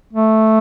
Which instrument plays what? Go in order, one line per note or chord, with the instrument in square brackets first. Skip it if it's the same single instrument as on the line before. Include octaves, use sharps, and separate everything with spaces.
[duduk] A3